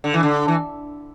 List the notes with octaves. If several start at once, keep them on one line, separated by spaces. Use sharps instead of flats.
D3
E3
D3
E3